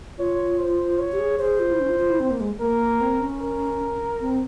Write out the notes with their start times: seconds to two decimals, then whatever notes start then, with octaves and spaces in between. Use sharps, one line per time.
0.18 F4 C#5
0.59 C5
0.99 C#5
1.12 G4
1.19 G#4
1.39 G#4 C5
1.60 F4
1.71 E4
1.80 C#4
1.89 F4
1.99 F4
2.09 E4
2.20 C4
2.30 A#3
2.40 G#3
2.60 A#3 A#4
3.01 C4
3.20 C#4
3.40 A#4
4.21 C4